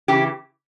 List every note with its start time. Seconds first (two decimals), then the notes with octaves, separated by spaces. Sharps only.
0.08 C#3 E3 G4